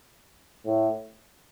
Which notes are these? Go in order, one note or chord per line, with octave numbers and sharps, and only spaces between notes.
A2